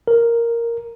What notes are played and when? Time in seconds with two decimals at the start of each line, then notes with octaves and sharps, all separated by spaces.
0.08 A#4